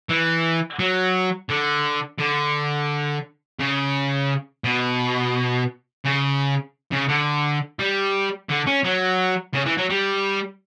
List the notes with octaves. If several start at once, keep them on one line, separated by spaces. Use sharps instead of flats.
E3
F#3
D3
D3
C#3
B2
C#3
C#3
D3
G3
D3
C#4
F#3
C#3
E3
F#3
G3